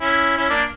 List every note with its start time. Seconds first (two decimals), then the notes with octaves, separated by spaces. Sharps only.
0.01 C#4 E4
0.38 C#4 E4
0.50 A#3 D4